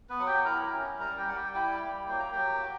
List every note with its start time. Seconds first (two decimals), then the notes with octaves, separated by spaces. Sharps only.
0.09 B3 B4
0.19 F#3 F#5
0.27 G4 G5
0.45 E4 A#4 A#5
0.73 C#4
0.99 G3 A#4 A#5
1.17 G4 G5
1.27 G3 F#5
1.36 G4 G5
1.53 E4 G4 G5
1.81 A#3
2.08 F#3 G5
2.19 A#5
2.32 F#3 G4 G5
2.63 F#4